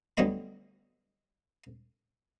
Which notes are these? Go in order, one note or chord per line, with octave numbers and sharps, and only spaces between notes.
D2 F#3 G3 B3 D#5 B5